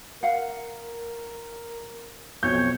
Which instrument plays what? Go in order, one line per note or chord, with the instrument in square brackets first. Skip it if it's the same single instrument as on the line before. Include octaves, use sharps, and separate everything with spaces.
[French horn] A#4 [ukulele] F5 F#5
[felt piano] B1 G6 [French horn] F2 [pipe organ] C#5